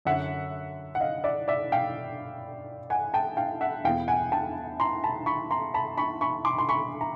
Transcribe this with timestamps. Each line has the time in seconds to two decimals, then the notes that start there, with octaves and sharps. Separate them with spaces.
0.05 F#2 D3 E5 F#5
0.95 F#5
1.00 D#5 F5
1.24 D5 E5
1.48 D5 E5
1.72 F5 G5
2.90 F#5 G#5
3.14 G5 A5
3.37 F5 G5
3.61 E5 F#5
3.84 E2 B2 F5 G5
4.08 F#5 G#5
4.32 G5 A5
4.80 A#5 C6
5.04 A5 B5
5.26 B5 C#6
5.51 A#5 C6
5.74 A5 B5
5.98 B5 C#6
6.21 B5 C#6
6.45 C6 D6
6.58 C6
6.69 B5 C#6
7.01 A#5